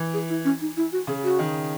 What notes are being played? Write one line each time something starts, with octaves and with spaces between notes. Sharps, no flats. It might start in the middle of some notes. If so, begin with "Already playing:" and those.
Already playing: E3
G#4
E4
C#4
D#4
E4
F#4
C#3 G#4
F#4
D#3